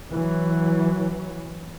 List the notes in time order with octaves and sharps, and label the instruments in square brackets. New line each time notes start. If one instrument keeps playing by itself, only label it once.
[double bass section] E3 F#3